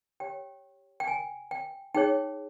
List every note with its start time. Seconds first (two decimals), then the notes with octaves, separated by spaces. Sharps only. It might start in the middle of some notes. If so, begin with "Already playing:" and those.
0.20 G4 C#5 G5
1.00 G5
1.08 G#5
1.51 G5
1.94 D#4 G#4 C#5 G5